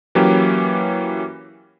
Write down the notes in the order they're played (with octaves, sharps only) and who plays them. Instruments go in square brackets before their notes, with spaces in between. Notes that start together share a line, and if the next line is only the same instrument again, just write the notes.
[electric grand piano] E3 F#3 A#3 C#4 G4